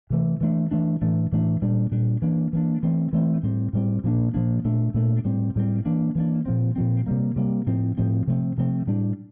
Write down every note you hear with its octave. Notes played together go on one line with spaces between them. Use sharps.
C3 E3 A3
E3 A3 D4
E3 A3 D4
A2 E3 A3 D4
A2 E3 A3 D4
A#2 G3 D4
A#2 G3 D4
E3 A#3 D4
E3 A#3 D4
E3 A3 C4
E3 A3 C4
A2 G3 C4
A2 G3 C4
A#2 F3 A#3 D4
A#2 F3 A#3 D4
A#2 A3 D4
A#2 A3 D4
A2 G3 C4
A2 G3 C4
E3 A#3 D4
E3 A#3 D4
A#2 F3 C4
A#2 F3 C4
C3 G3 A#3
C3 G3 A#3
A2 F3 C4
A2 F3 C4
C3 F3 A3 C4
C3 F3 A3 C4
A2 G3 D4